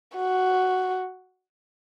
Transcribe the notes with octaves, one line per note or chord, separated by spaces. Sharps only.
F#4